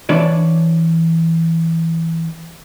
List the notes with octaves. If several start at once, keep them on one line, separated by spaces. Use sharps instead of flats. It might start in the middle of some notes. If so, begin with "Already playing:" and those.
E3 D4 B4 C#5 D5